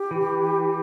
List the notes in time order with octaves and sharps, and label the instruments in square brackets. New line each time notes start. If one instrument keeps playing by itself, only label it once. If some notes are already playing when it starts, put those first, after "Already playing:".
Already playing: [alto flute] G4
[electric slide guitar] E3